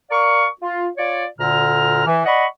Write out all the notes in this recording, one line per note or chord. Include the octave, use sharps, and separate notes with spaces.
A#4 D5 F5 C#6
F4
F4 C#5 D5
D2 A#2 D3 A#5 F6
E3
D5 D#5 F#5 B5 C#6